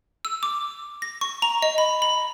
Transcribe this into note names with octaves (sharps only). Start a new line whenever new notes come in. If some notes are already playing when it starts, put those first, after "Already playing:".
E6
D6
A#6
C#6
A#5
D#5
B5
B5